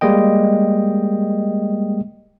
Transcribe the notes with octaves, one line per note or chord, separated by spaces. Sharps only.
G3 G#3 A#3 D#5 G5